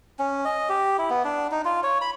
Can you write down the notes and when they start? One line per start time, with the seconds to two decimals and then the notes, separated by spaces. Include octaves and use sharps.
0.19 C#4
0.45 D#5
0.69 G4
0.98 E4
1.10 B3
1.24 D4
1.51 D#4
1.65 F4
1.84 C#5
2.01 B5